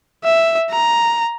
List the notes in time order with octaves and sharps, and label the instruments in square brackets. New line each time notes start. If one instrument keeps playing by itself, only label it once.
[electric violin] E5
A#5